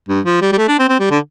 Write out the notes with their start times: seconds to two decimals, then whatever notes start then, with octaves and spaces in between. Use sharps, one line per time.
0.09 G2
0.26 F3
0.42 G3
0.53 G3
0.58 A3
0.68 D4
0.79 C4
0.89 C4
1.00 G3
1.11 D3